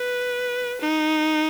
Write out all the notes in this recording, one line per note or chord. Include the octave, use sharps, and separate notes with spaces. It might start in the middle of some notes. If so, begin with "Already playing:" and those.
Already playing: B4
D#4